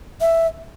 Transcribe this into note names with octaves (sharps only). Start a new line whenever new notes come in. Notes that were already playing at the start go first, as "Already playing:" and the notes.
E5